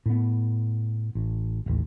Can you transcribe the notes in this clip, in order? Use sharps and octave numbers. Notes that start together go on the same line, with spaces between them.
A2 B3
A1
D1 A1 D#2